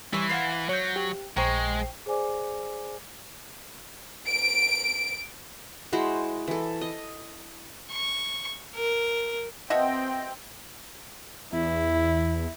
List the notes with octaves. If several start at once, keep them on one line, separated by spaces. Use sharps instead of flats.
E3 G3 C5 C#5 E5
C5 F5 F#5 A6 C7
F#3 C#5 C#6 G6
G4
A#1 G#3 C5 G5 A#5 C#6 C7
G#4 C5 D5 G#5 D6
D7
G#3 E4 F#4 C5
E3 A4
D#5
C#6
A#4
B2 C4 D#5 E5 F#5 G5 A#6
E2 E4